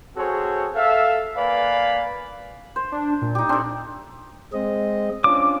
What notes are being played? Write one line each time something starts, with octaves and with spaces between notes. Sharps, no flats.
C4 F#4 G#4 A4 C5 C#5
A4 E5 F5
A#3 B4 D5 F5 G#5 B5
C5
D4
A#2
D#4 G4
C4 D4 A4
G#3 C4 D#5
C#4 D4 F4 D6